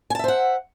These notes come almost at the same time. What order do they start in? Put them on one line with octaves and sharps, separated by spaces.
G#5 A5 E5 C5 F#5